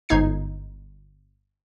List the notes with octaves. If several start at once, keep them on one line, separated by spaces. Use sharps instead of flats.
G1 G#2 D#4 G#6 C7